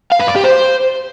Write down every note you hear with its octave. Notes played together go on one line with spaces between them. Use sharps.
F5
B4
D5
G4
C5